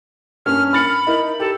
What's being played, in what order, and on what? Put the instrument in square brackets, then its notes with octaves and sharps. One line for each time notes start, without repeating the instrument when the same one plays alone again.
[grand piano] G2 A#3 C#4 [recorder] F6
[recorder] B5 [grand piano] F6 A6 C#7
[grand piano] D#4 E4 A#4
[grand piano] G4 [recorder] A4